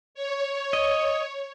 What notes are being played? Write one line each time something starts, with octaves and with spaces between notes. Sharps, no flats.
C#5
D#5